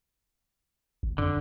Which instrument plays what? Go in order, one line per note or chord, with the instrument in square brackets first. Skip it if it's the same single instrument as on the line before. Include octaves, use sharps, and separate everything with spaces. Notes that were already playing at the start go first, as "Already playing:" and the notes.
[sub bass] G1
[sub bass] F2 [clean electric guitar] D3